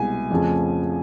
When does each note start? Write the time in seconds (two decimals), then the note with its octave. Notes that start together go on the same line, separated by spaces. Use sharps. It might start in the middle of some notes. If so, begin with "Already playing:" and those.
Already playing: C2 B2 G#3 G#5
0.31 F2 C#3 F3 A3